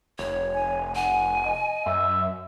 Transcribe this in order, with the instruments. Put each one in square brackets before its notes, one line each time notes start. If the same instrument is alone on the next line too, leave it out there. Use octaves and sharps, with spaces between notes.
[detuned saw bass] F1 [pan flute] C#5
[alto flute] G#5
[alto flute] F#5 [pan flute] G#5
[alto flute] D#5
[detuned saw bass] F#2 [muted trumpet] E5